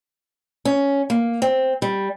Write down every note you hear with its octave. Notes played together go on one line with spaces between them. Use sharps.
C#4
A#3
C4
G3